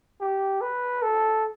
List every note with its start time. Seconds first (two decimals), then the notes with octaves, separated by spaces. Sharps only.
0.21 G4
0.61 B4
1.02 A4